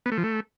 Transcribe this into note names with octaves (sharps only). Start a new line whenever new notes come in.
B3
A3
F3
A3